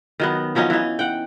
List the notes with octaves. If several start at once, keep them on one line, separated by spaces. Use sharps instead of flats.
D#3 F#3 B3
F3 F#3 C#4 D#4
E3 D#4
F#5 G5